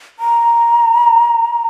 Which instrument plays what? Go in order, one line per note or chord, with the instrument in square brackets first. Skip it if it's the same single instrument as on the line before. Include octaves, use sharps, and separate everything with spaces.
[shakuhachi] A#5